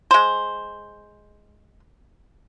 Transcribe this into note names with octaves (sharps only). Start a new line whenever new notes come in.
G#3 C5